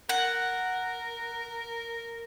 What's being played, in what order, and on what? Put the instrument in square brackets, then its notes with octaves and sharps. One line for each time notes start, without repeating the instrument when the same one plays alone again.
[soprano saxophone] A#4 [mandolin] F#5